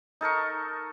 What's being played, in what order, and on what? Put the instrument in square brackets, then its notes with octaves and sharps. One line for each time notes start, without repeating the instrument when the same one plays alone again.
[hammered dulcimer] D#4 A4 A#4 C#6